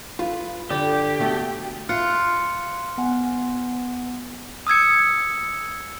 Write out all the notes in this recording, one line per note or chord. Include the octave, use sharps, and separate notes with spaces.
F4 B4
D3 G4 D5
B2 A3 A4
F4 F6 F#6 C#7
B3 F#5 G#5
D#6 E6 G#6 C#7